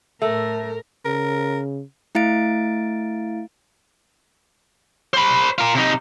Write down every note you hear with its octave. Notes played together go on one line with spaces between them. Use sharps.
A2 A3 A#4
C#3 A#4
A3 E4 F5 A6 D7
C5 B5
F4 A#4
C3 D#4